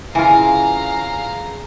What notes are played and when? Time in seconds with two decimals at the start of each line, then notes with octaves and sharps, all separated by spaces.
0.15 C#3 E3 F4 F5 G#5 A#5